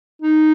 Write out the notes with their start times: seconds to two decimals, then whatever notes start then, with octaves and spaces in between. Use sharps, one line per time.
0.22 D#4